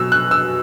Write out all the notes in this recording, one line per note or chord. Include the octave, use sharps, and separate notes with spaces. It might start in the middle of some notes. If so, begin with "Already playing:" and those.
Already playing: B2 F#3 E6
F#6
E6